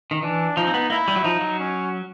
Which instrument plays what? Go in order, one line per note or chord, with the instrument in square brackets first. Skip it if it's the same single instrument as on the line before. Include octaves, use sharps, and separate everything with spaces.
[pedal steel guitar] D#3
[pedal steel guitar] E3 [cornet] D4
[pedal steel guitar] F3 [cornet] D#4
[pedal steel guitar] C4
B3
[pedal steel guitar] A#3 [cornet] E4
[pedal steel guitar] G3
F#3
[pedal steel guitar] F3 [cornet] D#4
[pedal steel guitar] F#3
[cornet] C#4